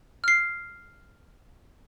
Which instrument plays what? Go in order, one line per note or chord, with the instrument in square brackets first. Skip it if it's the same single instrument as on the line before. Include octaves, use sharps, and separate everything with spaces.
[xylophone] F6 C7